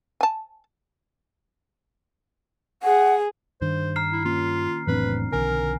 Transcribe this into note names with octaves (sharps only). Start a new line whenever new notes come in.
G#5 A5
G#4 F#5
G2 D#3 D4 C5
A#5 F6 C7
E4
A#3 C#4 F4
F1 A2 E3 F#3 C4 D4 B4
B1 D3 D#3 A#4 G#5